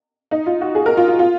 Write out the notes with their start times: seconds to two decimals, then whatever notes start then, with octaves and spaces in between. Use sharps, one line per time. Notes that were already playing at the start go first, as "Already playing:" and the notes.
0.31 D#4
0.46 F4
0.61 F#4
0.75 G#4
0.86 A#4
0.97 F4
1.08 F4
1.19 F4